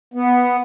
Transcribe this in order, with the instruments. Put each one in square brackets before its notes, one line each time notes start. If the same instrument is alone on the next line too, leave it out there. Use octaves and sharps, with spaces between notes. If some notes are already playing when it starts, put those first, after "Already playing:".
[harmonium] B3